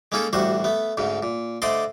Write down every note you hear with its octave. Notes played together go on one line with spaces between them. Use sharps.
G#3 A#3 C#4 D#4 G#4 A4
A1 D2 G3 F#4 C5 C#6
A3 B3
D2 G#2 C#3
A#2
D3 A3 C5 D5 D#5 C6